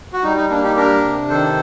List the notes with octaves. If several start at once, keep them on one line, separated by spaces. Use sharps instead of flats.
F#4
G3 D#4
D#4
A#3 D4
D#4 G4
D4 G4 A#4
C3
D#3 A4 C5